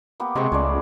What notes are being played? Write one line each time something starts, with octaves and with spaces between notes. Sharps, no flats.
A#3 B3 G4
C3 G#3 G5 C#6
C#2 G#3 A3 D5